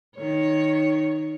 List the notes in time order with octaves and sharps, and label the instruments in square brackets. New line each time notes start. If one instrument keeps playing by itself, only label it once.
[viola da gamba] D#3 C#5